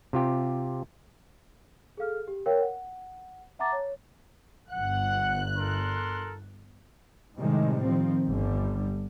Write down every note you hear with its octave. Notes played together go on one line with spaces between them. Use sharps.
C3 F4 G4
G#4 A4 F5 F6
G4
A#4 C#5 F5 G5
F#5
E5 F#5 A5 A#5 D6 A6
C#5
G1 F#5 F#6
A4 A#4 C6
A2 C3 D#3 G3 G#3
D#3 F3 C4
G1 D3 G3